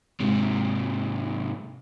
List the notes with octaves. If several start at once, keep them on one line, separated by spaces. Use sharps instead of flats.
G#2 C3